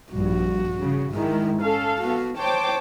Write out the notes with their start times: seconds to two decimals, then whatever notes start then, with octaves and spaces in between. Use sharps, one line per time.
0.13 A#1 G2 F#4
0.79 C#3
1.12 G#2 D#3 G#3 E4
1.62 C#4 A4 F5
2.01 B3 F#4
2.38 C5 C#5 G5 A5 D6